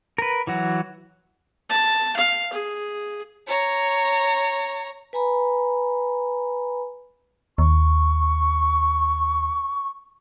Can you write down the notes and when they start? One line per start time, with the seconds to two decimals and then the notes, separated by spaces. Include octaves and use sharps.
0.18 A#4 B4
0.47 E3 F#3 F#4
1.69 A5
2.16 F5
2.53 G#4
3.47 C#5 A#5
5.13 B4 G#5 A#5 B5
7.58 D#2 C#6